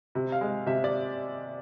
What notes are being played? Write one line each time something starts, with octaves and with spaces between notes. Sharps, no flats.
C3
F5
G#3
C3 E5
D5